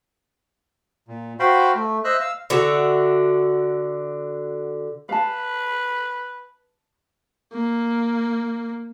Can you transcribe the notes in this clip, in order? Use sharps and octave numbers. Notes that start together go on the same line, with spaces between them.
A#2
F#4 C5 F5 G5 B5 C6
A3
C5 D#5 E5 E6 F#6
F5 E6
D3 F#4 E5
B4 F5 A5
A#3